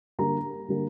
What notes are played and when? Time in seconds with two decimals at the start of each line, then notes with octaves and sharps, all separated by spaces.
0.19 D3 G3 A#3 A#5
0.68 D3 G3 A#3